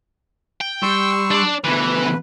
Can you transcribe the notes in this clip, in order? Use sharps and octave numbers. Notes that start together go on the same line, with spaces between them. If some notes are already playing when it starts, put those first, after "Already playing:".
G5
G3 C6 C#6 E6
D4 D5
D2 B2 E3 B4